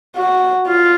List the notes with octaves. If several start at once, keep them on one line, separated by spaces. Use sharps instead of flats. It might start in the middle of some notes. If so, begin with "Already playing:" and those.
F#4
F4